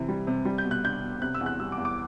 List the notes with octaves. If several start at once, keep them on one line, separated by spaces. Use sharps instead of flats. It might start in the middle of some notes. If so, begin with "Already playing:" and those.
Already playing: C3 E3
G3
C3
G3
G6
B2
F#6
D4 G6
B2
C3 F#6
E6
E2
F#6
G3 E6
D6
E2
D6